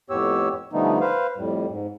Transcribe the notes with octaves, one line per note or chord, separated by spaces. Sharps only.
F2 A2 B3 G4 C#5 E6
D3 F3 G3 A3 B3 D#4
B4 C5 F5
F2 A2 G3
G#2